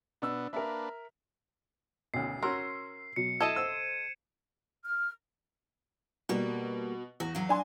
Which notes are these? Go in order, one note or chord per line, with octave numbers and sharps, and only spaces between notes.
B2 B3 D4 E6
A#3 D4 A#4 B4 E5
G#1 D2 B2 C#4 C7
C#4 F#4 A#4 C6 E6
B2 F#3 C#7
E4 A4 D#5 A5 G#6 D#7 E7
C5 E6
F6
B2 G3 A#3
E2 F#4
F#3 F5
D4 G#5 C6